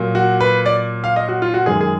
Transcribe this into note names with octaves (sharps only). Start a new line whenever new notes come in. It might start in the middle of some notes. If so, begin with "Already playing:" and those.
Already playing: A#2 F#3
F#4
B4
D5
F5
D#5
F#4
F4
F#4
F#2 D#3 G#3 G#4
G#4